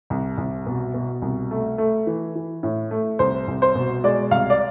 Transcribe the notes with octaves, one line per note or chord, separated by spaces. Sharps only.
C2
C2
B2
B2
C2
A3
A3
E3
E3
A2
A3
C2 C5
C2
C5
B2
G#3 D5
C2 F5
D5